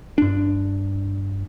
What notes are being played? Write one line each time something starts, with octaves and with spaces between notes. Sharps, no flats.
G2 D4